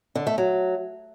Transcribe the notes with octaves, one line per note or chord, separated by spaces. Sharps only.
D3
A3
F#3